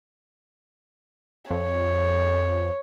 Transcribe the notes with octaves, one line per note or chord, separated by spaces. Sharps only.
F2 C#5